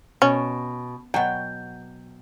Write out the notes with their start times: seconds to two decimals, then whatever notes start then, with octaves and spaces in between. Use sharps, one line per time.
0.22 B2 C#4
1.14 B2 F#3 G5